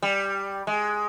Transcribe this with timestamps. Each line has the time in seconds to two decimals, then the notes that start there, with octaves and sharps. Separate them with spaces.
0.02 G3
0.67 G#3